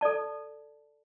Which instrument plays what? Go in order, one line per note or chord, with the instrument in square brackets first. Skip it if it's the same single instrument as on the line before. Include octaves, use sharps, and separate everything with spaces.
[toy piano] A4 D5 A5